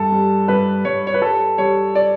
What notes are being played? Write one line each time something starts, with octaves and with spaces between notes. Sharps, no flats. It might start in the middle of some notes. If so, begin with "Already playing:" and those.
Already playing: G2 A4
G3
G2 B4
G2 C#5
C#5
B4
G3 A4
G3 C#5
D5